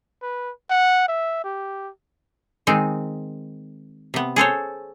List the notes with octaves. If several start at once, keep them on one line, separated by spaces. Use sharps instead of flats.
B4
F#5
E5
G4
D#3 G#3 C4 D#4
C3 B3
G#4 A4 C5 C#5